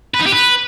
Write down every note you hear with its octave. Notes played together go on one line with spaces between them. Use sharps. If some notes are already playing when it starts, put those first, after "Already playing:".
B4
D#4
G4
B4